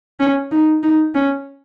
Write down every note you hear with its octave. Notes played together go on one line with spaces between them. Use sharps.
C#4
D#4
D#4
C#4